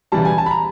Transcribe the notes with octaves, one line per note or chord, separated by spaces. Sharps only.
C#3 E3 G3 A5
G#5
A5
B5
A#5